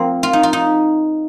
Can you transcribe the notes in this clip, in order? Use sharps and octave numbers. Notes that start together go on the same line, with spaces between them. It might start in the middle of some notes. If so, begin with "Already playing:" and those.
Already playing: F3 A#3 C4
F4
D#4
F4
D#4